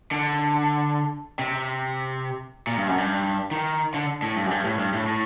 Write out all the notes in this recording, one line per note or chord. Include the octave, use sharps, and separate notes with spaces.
D3
C3
A#2
G2
F#2
G2
D#3
D3
A2
G2
F#2
G2
A2
G2
A2
A2